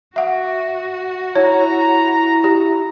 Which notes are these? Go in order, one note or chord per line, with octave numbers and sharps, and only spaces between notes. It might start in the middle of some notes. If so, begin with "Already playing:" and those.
F#4 E5 F#5
E4 C#5 A#5
G4